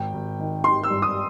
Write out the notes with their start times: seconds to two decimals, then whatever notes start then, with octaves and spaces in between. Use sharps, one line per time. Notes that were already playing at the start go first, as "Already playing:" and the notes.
Already playing: G#1 G5
0.14 G#1
0.39 D#3
0.64 D#3 C6
0.83 E6
0.90 G2
1.02 D#6